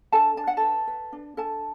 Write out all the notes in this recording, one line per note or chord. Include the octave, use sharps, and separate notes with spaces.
D4 A4 A5
D4 A5
F#5
A4 A5
B4
B4
D4
D4 A4 A5